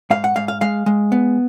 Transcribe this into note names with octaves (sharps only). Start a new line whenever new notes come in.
G#2 F5
F#5
G#2 F5
F5
G#3 F5
G#3
B3